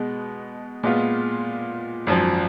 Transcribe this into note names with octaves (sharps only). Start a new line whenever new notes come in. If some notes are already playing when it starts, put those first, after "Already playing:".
Already playing: B2 G#3 B3
A#2 G#3 B3 F4
G#1 F#2 F3